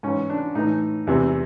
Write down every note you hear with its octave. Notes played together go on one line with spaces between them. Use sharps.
G#2 E3 C#4
D4
A2 E3 D#4
E2 C3 E3